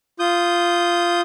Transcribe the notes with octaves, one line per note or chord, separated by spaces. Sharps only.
F4 D#6 G6